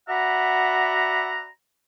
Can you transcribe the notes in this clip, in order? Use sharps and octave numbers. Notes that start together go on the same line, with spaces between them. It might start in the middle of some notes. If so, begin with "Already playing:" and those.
F#4 D5 E5 F#5 A#5 B5